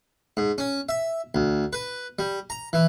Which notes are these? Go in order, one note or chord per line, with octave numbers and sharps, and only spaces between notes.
G#2
C#4
E5
D2
B4
G3
A#5
E3